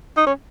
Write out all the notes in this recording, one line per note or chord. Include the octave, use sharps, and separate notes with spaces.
D#4
C#4